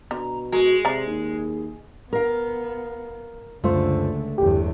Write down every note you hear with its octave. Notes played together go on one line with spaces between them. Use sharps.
B2 D3 A#5
G#3 F#4 A#4
C3 G#4 D5 E5 A#5
D#2
B3 A#4 F5
C#2 F#2 D3 A3 F4 C5
G1 E2 G4